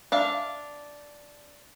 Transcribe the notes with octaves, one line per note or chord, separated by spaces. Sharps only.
D4 E5 F5